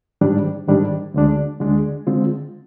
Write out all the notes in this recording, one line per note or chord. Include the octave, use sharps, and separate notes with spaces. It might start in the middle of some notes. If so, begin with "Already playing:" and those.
G#2 D#3 G3 D4
G#2 D#3 G3 D4
D2 D3 G#3 D4
D2 D3 G#3 D4
D3 G#3 C4 F4